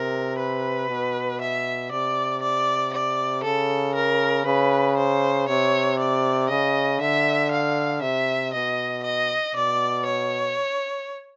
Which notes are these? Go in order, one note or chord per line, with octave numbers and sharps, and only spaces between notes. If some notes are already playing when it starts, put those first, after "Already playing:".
Already playing: C3 A#4
B4
B2
E5
C3 D5
D5
D5
C#3 A4
A#4
C#3 B4
C5
C3 C#5
D5
C#3 D#5
D3 E5
F5
C3 E5
B2 D#5
D#5
B2 D5
C#5